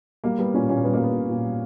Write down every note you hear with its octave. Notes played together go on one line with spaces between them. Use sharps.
G3 A#3
G3 B3
A#2 C#4
A#2 C#4
G3 B3
A#3
G3 B3
A#2
A#2
G3